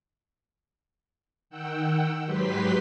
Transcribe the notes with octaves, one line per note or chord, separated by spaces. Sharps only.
D#3 F#5 G5 E6
G#2 F#3 G4 B4 C6 B6